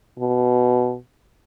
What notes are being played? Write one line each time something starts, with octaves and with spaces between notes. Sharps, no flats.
B2